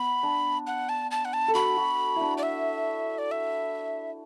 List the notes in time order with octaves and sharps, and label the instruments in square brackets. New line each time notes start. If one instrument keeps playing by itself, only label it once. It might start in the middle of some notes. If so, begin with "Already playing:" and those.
Already playing: [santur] B3 [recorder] B5
[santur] D4
[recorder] F#5
A5
A5
F#5
A5
[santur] A4
[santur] F#4 [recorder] B5
[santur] F#4
D4 E4
[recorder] D5
E5
D5
E5